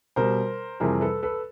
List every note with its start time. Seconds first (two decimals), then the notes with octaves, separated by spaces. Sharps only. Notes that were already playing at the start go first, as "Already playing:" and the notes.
0.16 B2 G3 A#4 C5
0.80 F2 C3 E3 G3 G#4 A#4
1.01 A4 B4
1.22 A4 B4